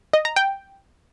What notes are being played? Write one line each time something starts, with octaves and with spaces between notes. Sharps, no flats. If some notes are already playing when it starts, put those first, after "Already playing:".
D#5
A#5
G5